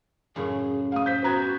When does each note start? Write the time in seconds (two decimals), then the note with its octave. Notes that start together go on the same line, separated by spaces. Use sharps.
0.36 F#2 A2 C#3 G#4
0.92 A3 F5 D#6
1.06 C5 G6 B6
1.24 B3 C4 F#4 B4 A#5 F#6 G#6